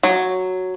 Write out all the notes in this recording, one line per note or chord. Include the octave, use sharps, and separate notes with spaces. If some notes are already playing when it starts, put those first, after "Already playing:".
F#3